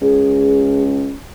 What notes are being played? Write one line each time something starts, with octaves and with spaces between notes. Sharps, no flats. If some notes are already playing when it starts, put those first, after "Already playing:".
C#2 G#4